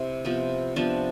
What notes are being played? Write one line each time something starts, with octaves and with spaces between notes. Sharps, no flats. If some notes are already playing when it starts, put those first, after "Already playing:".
Already playing: C3 E4
C3 F3 B3
C3 F3 B3 D4